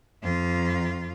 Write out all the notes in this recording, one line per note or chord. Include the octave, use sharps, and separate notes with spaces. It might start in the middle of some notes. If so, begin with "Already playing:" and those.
F2 F4